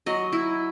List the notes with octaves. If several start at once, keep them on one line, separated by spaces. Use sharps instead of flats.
F#3 D#5
E4